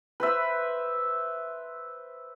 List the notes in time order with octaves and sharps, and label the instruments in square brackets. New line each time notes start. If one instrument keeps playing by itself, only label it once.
[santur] B4 C5 E5